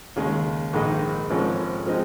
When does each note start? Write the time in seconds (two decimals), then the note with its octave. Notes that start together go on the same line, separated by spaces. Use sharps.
0.16 D#2 C#3 G#3
0.73 A#1 G#2 D#3 G#3 D#4
1.30 G#1 G#2 F3 G#3 C#4
1.87 F3 G#3 C4 D#4